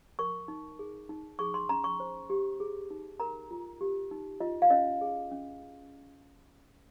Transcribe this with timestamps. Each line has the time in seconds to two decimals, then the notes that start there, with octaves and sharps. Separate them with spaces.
0.19 A#4 C#6
0.48 D#4
0.79 G#4
1.09 D#4
1.39 G#4 C#6
1.54 C6
1.69 C#4 A#5
1.84 C#6
2.00 C5
2.30 G4
2.60 G#4
2.91 D#4
3.20 A#4 A#5
3.51 F4
3.81 G4
4.11 D#4
4.40 F4 D#5
4.62 F5
4.70 C#4 D#5
5.01 G#4
5.32 C#4